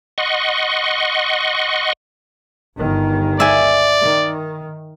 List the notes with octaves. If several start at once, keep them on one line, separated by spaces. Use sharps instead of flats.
D#5 F#5 C6 C#6
G1 D#3
D5 E5 G#5
D#3